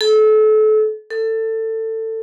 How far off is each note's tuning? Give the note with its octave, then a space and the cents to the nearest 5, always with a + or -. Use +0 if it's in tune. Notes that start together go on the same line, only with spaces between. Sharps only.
A4 -30
A4 +20